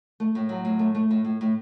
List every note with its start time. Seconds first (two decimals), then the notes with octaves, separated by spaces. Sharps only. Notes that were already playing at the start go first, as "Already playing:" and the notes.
0.20 A3
0.35 A2
0.49 F#3
0.65 A2
0.79 A3
0.95 A3
1.11 A2
1.25 A2
1.41 A2